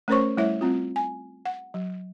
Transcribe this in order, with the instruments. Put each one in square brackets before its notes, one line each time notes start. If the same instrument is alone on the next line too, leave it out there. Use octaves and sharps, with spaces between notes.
[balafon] A3 C#4 A#4 C5 C#5 C#6
G3 A3 E4 C#5 E5
G3 C4 F4
G#5
F#5
F#3